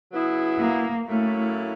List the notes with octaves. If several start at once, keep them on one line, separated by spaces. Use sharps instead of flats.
C#3 F#3 B3 E4 G#4
A#3
A2 F#3 A3 A#3 C#4 E4